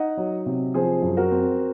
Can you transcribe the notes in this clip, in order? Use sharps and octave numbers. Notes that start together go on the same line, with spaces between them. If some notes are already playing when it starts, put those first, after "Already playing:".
Already playing: D#4 D#5 F#5
F#3
C3
F3 G#4 C5
F#2
F#4 A#4
C4